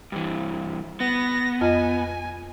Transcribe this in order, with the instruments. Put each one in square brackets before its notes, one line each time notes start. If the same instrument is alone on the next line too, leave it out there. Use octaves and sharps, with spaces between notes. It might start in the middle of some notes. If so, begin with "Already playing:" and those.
[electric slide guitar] G2 E3
[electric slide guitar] B3 [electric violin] A#6
[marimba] F2 F4 D#5 [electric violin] G#5